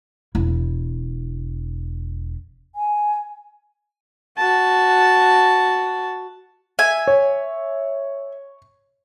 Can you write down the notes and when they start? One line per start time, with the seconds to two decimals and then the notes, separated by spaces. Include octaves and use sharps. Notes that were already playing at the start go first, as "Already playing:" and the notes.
0.35 E1 E4
2.75 G#5
4.38 F#4 A5
6.79 E5 G#5
7.07 C#5